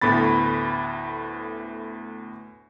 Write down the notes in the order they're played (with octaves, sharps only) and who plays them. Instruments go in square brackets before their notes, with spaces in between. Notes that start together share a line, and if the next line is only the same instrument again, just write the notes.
[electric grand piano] D2 A2 B3 B5 A6